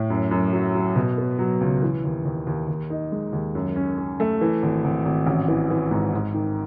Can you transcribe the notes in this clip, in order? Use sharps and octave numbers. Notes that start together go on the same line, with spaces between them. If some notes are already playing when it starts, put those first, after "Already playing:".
Already playing: A2
F#2
F#2
F#3
F#3
B2
B3
F#3
C#2
E3
D#2
D#2
D#2
D#2
D#4
G#3
D#2
F#2
C#4
C#4
A3
E3
G#1
G#1
G#1
A1
E3
E3
G#2
G#2
D#3